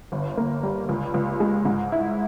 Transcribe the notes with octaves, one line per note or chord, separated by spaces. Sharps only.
G1
A#3
G3
C#2
C#2
G#3
G#2
E4